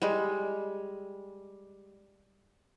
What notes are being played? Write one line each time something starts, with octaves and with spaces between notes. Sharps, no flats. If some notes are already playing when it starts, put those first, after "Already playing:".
G3 G#3